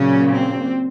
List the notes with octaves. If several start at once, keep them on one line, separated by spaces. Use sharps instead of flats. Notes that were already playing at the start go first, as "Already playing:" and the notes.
Already playing: A#2 C#3 F#3 A#3 C#4
C4